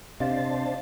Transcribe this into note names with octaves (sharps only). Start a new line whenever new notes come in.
C3 D4 C5 D#5 F5 A5